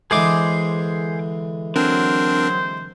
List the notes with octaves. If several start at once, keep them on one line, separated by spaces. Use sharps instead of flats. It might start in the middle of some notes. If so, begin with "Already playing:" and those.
D3 E3 G#3 G#4 C5 D6
F#3 C4 D4 A#4 C5